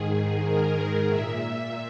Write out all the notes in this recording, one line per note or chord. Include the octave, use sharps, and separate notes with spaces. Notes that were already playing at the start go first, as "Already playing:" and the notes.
Already playing: G#2 D#3 G#4
G#4
A#4
G#4
A#2 E5